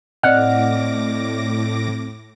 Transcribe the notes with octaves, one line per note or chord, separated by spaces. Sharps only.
A2 C4 D5 D#5 F#5 D6 F6 A#6